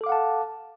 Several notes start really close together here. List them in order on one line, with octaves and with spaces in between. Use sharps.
A4 D6 F5 F#5 A5